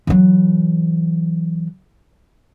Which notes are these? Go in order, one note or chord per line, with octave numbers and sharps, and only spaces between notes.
E3 F#3